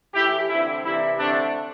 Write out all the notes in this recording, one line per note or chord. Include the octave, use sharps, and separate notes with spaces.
A2 E3 A3 E4 G4
D3 G3 C4 E4
C3 E3 G3 E4
D3 A3 C4 D4